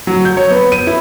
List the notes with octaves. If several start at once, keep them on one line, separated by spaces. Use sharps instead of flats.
F#3
G6
C#5
B3
D#7
E4